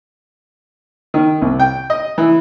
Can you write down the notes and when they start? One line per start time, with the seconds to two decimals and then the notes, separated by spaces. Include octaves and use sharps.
1.14 D#3
1.42 C2
1.60 G5
1.90 D#5
2.18 E3